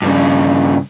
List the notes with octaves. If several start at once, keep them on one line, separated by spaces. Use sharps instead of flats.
G2 C#3